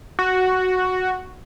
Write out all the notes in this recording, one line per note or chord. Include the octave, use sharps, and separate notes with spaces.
F#4